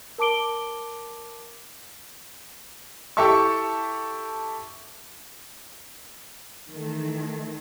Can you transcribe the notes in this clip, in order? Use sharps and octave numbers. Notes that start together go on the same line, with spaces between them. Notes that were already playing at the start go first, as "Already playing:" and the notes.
A#4 A5 D6 D7 G7
E4 G4 A4 E5 A5 C#6
D#3 E3 A3